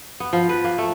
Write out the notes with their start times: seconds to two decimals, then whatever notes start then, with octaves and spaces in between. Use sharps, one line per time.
0.20 B3
0.33 F3
0.49 B4
0.64 A#3
0.78 A3